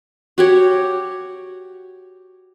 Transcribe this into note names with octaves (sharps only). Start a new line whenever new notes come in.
F#4 G4 C#5